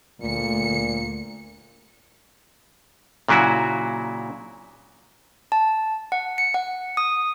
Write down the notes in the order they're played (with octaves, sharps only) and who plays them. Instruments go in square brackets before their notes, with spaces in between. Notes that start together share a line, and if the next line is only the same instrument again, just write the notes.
[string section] D2 C#7 [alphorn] A#2
[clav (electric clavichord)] A#2 C#3 F#3 E4 F#4
[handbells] A5
F#5
C#7
F#5
D#6